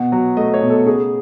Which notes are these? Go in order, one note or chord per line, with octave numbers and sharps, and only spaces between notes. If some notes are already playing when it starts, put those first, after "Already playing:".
Already playing: B2 F#5
F#3
A3 D#5
C#5
B2
A4
C#3 G#4